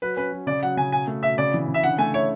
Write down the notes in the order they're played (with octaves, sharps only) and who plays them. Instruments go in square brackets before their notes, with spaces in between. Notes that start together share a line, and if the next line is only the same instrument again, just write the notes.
[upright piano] F#3 [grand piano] B4
[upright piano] C#4 [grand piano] B4
[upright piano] F#3
[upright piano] C#3 [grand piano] D5
[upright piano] F#3 [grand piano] F#5
[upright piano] C#3 [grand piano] G#5
[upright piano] B2 [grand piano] G#5
[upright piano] A3
[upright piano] B2 [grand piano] E5
[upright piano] C#3 [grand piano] D5
[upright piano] E3
C#3
[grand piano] E5
[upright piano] D3 [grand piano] F#5
[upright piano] A3 [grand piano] G#5
[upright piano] E4 [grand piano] C#5